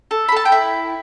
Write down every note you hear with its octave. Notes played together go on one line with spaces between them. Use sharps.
A4
B5
A4 A5
G5
E4